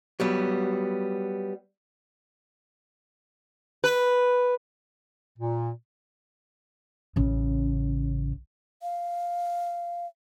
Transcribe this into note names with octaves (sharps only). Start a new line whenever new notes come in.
F#3 G3 B3
B4
A#2
A1 C#3
F5